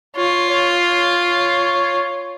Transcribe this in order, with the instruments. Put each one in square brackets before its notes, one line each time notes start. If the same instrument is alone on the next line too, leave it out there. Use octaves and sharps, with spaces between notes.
[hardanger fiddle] F4 [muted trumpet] C#5
[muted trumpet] C#5